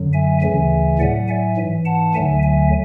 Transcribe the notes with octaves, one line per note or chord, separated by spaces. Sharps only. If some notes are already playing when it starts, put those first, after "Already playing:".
Already playing: F#2 D3 F#3
E5 G#5
D2 C#3 E3 E5 G#5
A2 F#3 D5 F#5
E5 G#5
G#2 E3
F#5 A5
D2 D3 F#3 E5 G#5
E5 G#5